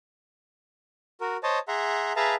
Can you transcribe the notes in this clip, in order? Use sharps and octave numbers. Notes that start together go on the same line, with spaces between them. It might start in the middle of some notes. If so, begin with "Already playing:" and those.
F#4 A#4
C5 C#5 D#5 A5
G#4 E5 F#5 A#5 C6
G#4 B4 E5 F5 A5 A#5